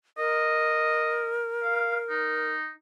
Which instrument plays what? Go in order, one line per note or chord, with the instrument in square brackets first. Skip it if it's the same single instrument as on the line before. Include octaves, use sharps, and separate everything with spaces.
[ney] A#4 [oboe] D#5
[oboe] F5
D#4